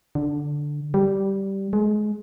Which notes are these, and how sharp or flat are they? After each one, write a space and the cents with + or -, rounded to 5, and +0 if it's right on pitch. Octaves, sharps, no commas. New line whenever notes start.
D3 +0
G3 -10
G#3 +25